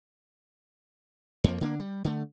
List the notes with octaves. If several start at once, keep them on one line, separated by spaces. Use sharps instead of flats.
F2 F3 A#3
D3 A#3 D4
G3
D3 A3